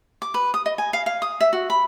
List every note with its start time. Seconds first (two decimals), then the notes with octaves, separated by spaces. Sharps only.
0.22 D6
0.34 B4
0.54 D#6
0.66 D#5
0.78 G#5
0.93 F5
1.06 F5
1.22 D#6
1.41 E5
1.53 F#4
1.70 B5